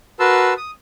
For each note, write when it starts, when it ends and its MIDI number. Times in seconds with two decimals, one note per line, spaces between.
0.20 0.54 66
0.20 0.54 70
0.20 0.54 71
0.20 0.54 81
0.20 0.54 84
0.20 0.54 88
0.57 0.71 87